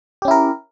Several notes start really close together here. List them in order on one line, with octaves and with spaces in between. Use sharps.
G4 C#4 E4 A#4